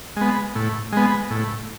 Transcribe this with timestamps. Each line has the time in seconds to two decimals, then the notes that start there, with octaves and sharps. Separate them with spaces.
0.17 G#3 B3
0.55 A2
0.92 G#3 B3
1.30 A2